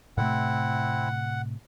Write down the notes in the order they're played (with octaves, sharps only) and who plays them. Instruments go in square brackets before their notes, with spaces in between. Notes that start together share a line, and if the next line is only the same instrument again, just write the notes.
[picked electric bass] A2 C3 A3 [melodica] C4 E4 [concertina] F#5